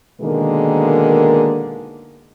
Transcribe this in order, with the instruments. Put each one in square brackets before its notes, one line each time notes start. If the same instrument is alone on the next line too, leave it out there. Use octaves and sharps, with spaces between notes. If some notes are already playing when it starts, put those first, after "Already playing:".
[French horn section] B2 D3 D#3 G#3 A#3 A#4